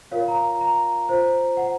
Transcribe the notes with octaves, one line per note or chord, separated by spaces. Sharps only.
F4 A#4 C#5 F5
A#5
A#5
F4 C5
F#5